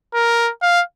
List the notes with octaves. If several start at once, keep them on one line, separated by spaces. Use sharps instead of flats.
A#4
F5